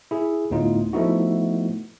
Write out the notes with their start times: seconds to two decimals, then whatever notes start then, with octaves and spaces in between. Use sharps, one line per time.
0.11 E4 G#4
0.50 D2 A2 B3 D#4 F4
0.93 F3 A3 B3 D#4 E4 F#4